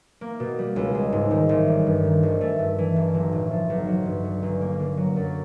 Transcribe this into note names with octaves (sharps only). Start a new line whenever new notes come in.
A#3
B2
G3
C#2
G#3
G#2
D#3
A1
G3
G2
D#3
G#1
A3
G2
E3
G1
B1
A2
F3
B1
F#3
G2
D3
G1
A#3
D3
F#3
F#2